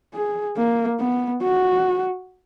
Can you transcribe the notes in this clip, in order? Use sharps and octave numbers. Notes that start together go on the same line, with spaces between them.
G#4
A#3
B3
F#4